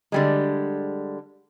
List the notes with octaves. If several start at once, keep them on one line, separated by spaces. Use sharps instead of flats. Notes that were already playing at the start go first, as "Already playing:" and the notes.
D3 G3 G#3